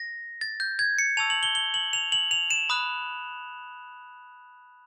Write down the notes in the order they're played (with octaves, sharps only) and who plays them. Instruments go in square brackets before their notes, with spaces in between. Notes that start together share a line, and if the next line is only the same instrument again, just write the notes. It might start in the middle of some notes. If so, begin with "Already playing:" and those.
Already playing: [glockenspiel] A#6
A6
G6
G#6
C#7
A5 C#6 E6 F7
F#7
G7
G7
F#7
F7
F#7
F7
E7
B5 D#6 F#6